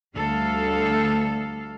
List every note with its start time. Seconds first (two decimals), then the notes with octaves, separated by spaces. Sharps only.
0.16 D2 G3 A4 F5